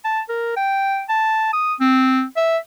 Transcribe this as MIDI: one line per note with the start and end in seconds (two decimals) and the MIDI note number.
0.04 0.21 81
0.29 0.54 70
0.56 1.03 79
1.09 1.51 81
1.53 1.74 87
1.80 2.24 60
2.36 2.58 76